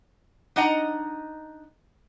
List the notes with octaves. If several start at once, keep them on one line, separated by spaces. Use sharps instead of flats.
D4 D#4 D#5 F#5 A#5